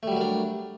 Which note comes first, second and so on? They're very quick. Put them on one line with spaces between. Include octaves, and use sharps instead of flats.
A3 G3 F#3 A#4 D4